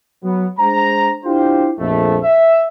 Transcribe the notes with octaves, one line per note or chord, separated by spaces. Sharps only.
F#3 B3
G#3 D4 C5 A#5
D4 E4 F4 G4 C5
A#1 F2 A3
E5